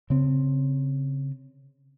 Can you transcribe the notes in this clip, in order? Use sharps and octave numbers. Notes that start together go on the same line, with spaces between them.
C#3 C4